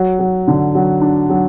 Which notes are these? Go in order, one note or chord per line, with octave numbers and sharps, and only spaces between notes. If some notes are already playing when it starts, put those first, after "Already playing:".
Already playing: F#3
F#3
D3
F#3
D4
F#3